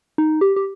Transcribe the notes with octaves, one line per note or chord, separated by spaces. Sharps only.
D#4
G4
G4